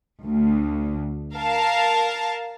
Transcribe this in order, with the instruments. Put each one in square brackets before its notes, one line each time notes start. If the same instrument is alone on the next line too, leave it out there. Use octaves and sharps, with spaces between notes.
[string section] D2
A#4 F5 A5